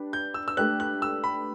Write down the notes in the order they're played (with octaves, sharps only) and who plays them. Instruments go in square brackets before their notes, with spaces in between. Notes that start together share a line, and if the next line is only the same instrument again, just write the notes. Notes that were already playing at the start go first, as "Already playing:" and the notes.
Already playing: [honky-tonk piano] D4 G4 B4
[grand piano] G6
E6
E6
[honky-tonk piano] A3 D4 G4 B4 [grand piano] F#6
[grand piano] F#6
E6
B5